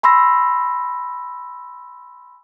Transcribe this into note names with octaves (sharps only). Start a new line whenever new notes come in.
G#5 B5 C6 E6 A#6